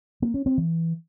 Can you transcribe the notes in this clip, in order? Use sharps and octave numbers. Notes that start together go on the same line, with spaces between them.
A#3
C#4
C4
E3